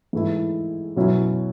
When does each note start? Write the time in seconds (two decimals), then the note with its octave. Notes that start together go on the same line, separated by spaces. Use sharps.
0.13 G#2 E3 A3 E4
0.96 B2 F#3 C#4 E4